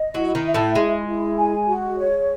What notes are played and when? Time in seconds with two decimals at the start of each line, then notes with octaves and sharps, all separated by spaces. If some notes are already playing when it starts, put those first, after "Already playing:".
Already playing: D#5
0.14 F#3 E4 F#4
0.35 D#3 D#4
0.45 E5
0.54 A2 A3
0.75 G#3 E4
1.06 E4
1.37 G#5
1.67 F#4
1.98 C#5